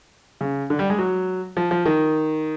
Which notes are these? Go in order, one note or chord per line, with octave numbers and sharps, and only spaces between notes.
C#3
D3
G3
G#3
F#3
F3
F3
D#3